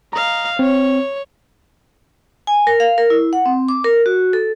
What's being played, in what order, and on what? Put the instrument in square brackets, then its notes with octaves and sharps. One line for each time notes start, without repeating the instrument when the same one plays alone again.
[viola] D#5 F5 [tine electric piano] A#5
[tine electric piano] C4 [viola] C#5
[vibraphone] G#5
A#4
F5
A#4
E4
F#5
C4
D6
A#4
F#4
A4